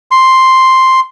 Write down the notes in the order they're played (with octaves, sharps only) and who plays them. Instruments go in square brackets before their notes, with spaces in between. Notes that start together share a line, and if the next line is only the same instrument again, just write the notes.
[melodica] C6